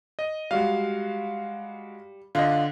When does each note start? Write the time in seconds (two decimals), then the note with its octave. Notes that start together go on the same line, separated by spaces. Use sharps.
0.19 D#5
0.51 G3 G#3 F#4 F5
2.35 D3 D4 F4 D#5